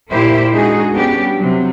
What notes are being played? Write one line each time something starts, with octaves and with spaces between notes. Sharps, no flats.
A#2 A#3 E4 G4 C5
G#3 D4 D#4 F#4 G#4
G3 B3 C#4 D4 G4
C3 F#3